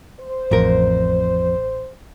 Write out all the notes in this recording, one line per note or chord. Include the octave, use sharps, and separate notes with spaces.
C5
A1 F2 A#4